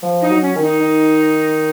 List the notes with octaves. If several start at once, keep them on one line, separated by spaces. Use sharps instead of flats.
F3
D#4
F#3
C#4
D#3
D#4
D#3